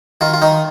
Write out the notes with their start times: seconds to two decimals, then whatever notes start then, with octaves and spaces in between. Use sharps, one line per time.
0.21 D#3 F4
0.34 F4
0.42 D#3 D#4